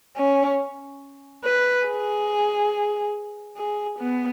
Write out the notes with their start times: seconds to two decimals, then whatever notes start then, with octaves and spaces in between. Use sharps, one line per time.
0.17 C#4
1.44 B4
1.87 G#4
3.57 G#4
3.99 B3